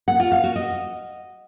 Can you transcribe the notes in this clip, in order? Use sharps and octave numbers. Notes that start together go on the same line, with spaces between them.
F#5
F4
F5
F#4
D#5